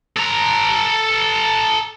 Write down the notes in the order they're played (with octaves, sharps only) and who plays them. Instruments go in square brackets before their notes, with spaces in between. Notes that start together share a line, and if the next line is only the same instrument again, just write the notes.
[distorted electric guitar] A4 A#5